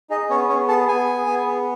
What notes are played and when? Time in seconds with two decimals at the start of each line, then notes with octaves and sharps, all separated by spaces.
0.10 D#4 G#4 D#5
0.29 B3 C#4 C#5
0.49 B3 C#4 C#5
0.68 G#4 A4 A5
0.88 B3 G#4 G#5
1.07 G#4
1.27 B3
1.46 B3